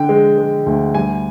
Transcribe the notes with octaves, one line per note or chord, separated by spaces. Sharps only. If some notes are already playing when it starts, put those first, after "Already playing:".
Already playing: D3 G5
G#3
G#3
D2
G3 G#5